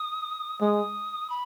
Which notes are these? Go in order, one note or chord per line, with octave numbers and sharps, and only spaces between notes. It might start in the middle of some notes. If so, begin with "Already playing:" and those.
Already playing: D#6
G#3 D#6
B5